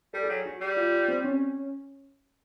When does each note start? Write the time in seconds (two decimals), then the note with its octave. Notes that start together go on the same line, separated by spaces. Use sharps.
0.14 G3 A4
0.24 G#4
0.29 F#3
0.35 G#4
0.46 F#4
0.61 G3
0.76 F4
1.08 C4
1.24 C#4